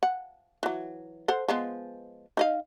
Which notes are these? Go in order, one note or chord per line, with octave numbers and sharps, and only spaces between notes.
F#5
E3 F#3
A4 C5 F#5
F3 G#3 B3
D#4 D#5 F5